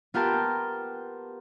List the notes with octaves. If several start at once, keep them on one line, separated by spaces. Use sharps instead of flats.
B3 F4 G4 A#4 G5 A5